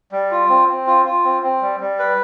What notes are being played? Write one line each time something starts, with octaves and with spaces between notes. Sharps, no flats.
G3
F4
C4
C4
F4
F4
C4
C4
G3
G3
B4